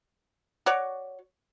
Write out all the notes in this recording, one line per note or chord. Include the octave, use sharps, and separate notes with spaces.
F#4 C#5 D5